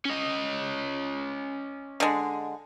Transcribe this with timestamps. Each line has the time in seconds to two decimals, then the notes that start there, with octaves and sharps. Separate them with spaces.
0.05 C#4 D#5
2.00 D3 G#3